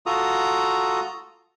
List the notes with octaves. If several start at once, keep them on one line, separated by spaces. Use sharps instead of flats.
F4 F#4 A4 A#5 D#6